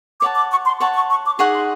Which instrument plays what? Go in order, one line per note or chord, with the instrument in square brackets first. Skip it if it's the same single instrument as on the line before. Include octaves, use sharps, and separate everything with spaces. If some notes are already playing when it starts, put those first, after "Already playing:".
[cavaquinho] C#5 F#5 A5 [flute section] D6
[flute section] D6
C#6
C6
[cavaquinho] C#5 F#5 A5 [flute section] C#6
[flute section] C#6
C#6
D6
[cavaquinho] D#4 G#4 C#5 F#5 [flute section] C#6
[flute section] C6